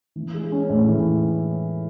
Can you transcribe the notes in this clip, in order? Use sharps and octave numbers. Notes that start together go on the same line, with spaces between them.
E3
G#3
C#4
A2
E3